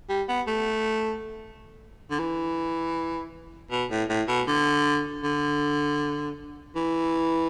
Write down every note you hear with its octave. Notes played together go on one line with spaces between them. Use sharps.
G3
B3
A3
D3
E3
B2
A2
A2
B2
D3
D3
E3